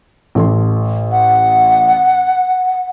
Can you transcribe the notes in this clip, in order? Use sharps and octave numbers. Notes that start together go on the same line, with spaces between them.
A1 A4 C6
F#5